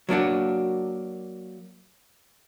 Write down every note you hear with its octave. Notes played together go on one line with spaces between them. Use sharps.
F#3 A#3 D4 F#4